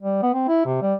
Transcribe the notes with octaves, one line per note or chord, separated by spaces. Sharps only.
G3
B3
C4
E4
C3
G3